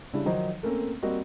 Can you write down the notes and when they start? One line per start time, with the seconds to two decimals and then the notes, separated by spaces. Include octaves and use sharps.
0.13 C#3 G3 D4 E4
0.25 D#3 F3 F#3 D#4 C5
0.63 A3 A#3 C4 C#4
1.03 G3 A#3 C4 F#4 D#5